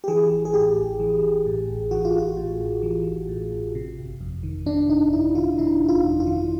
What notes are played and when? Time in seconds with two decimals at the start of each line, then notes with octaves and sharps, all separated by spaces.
0.04 G4
0.08 E3 G#4
0.31 A1
0.45 G#4
0.54 A2 G4
0.77 A1
1.00 E3
1.23 A1
1.46 A2
1.69 A1
1.91 E3 F#4
2.05 F4
2.15 A1 F#4
2.37 A2
2.60 A1
2.83 E3
3.06 A1
3.29 A2
3.52 A1
3.75 C3
3.98 G1
4.21 F2
4.43 D#3
4.66 C3 D4
4.89 G1 D#4
5.12 F2 E4
5.35 D#3 F4
5.58 C3 E4
5.81 G1
5.89 F4
6.04 F2
6.20 F4
6.27 D#3